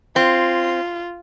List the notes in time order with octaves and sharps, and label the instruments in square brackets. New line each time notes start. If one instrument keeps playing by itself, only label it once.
[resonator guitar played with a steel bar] C4 [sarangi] F4